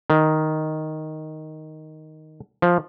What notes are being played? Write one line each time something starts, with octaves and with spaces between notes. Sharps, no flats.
D#3
F3